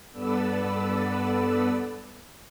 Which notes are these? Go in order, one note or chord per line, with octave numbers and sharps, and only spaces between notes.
G2 B3 A4 B4 D5 E6